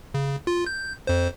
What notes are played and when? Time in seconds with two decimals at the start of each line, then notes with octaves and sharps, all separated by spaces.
0.14 C#3
0.47 F4
0.66 G6
1.07 F2 C5